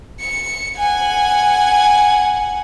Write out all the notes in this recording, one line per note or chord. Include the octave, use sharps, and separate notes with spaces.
C#7
F#5 G#5